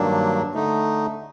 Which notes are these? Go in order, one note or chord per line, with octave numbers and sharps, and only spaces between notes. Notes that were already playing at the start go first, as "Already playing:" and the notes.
Already playing: G2 D#3 F#3 A#3 D4
D3 A3 D#4